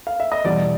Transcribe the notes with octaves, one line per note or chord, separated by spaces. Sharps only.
F5
E5
D#5
E2 B2 G3 D5